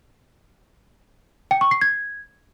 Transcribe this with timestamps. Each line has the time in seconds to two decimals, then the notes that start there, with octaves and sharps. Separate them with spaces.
1.51 G5
1.61 C#6
1.71 C7
1.81 G#6